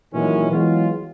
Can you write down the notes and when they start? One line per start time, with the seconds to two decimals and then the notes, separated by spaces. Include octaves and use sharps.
0.13 A#2 D#3 E3 F#3 G#3 C#4
0.51 E3 F#3 G#3 B3 F4